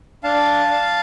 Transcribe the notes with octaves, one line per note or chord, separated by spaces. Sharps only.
D4 F5 A5